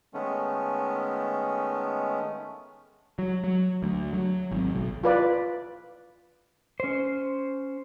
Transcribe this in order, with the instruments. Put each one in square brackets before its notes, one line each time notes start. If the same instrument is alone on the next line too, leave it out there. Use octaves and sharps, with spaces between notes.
[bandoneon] D#3 G#3 A3 B3 C#4
[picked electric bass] F#3
F#3
D2
F#3
G#1
B1
[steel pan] F4 B4 D5
[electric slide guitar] C#4 C5